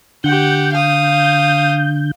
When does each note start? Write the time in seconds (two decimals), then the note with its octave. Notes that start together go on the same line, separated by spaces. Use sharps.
0.24 D3 G4 F#5 G6
0.73 F5 D#6